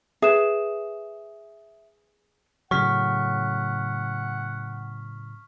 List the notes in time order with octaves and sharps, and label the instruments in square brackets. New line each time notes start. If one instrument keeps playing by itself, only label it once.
[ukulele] G#4 B4 [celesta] E5 E7
[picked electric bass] A2 C#3 F#3 [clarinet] F#5 [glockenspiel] C#6 F6 B6